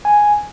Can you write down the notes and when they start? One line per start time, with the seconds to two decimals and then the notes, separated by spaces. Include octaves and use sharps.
0.05 G#5